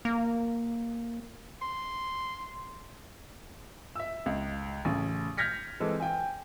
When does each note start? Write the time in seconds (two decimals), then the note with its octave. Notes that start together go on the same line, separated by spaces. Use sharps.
0.05 A#3
1.62 C6
3.96 E5 E6
4.26 C#2
4.85 A1 C#3
5.38 F6 G6 G#6 A#6 B6 C#7
5.80 E3 G#3 C4 A4
6.00 G5 G#5